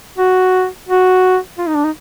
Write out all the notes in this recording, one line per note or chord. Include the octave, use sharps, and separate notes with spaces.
F#4
F#4
F4
D#4
D4
D#4